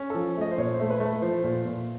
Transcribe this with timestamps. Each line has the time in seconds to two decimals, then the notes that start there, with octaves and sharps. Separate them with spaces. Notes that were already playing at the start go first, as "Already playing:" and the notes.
Already playing: C#4
0.10 F3 A4
0.37 A3 D#5
0.51 C5
0.58 A#2 C#5
0.74 C5
0.80 A3
0.90 B4
1.00 A3
1.05 B4
1.21 F3 C5
1.44 A#2
1.65 A#2